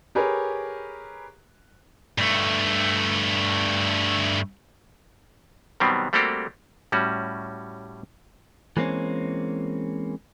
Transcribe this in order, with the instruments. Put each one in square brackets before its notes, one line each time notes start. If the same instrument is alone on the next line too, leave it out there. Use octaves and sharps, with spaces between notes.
[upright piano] G4 G#4 A#4 B4 C#5
[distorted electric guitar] G2 A3
[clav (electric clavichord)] B2 D#3 F#3 G3 B3 C4
G3 A3 A#3 C4 F#4 G4
A2 G3 C#4 F#4
[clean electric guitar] E3 G#3 A#3 C4 C#4